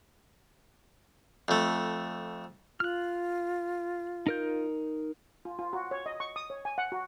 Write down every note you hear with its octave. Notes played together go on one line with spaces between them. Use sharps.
F2 A3
F4 F6 F#6
D#4 A#4 G6
F4
F4
F#4
C#5
D#5
C#6
D#6
C#5
G#5
F#5
F#4